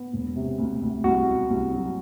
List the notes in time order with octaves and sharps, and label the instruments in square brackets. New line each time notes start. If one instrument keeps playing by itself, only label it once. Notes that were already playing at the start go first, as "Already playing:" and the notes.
Already playing: [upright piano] B3
E1
C3
D2
D2
[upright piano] C2 [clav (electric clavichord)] F#4
[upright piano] B2
C2
F#3